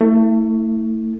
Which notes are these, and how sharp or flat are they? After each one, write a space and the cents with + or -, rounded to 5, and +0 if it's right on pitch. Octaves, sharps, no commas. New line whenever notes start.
A3 +30 E4 -20